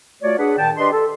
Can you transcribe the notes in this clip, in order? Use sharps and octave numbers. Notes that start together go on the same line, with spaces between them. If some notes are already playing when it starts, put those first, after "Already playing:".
A3 F4 F#4 C#5 D5
D4 G#4 B4 F#5
A#2 D#3 G5 A5
D4 G4 B4 D5 D#5 C6
A4